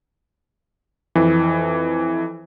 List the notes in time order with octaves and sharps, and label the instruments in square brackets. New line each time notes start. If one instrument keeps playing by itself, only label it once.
[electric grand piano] F2 E3